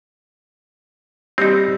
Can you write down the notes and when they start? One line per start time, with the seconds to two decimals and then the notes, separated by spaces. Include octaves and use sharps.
1.38 G3 C4 D#4